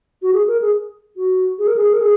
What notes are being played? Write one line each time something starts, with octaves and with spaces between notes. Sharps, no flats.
F#4
G#4
A#4
G#4
F#4
G#4
A#4
G#4
A#4
G#4